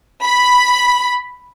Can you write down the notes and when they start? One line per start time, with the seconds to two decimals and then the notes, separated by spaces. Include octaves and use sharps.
0.23 B5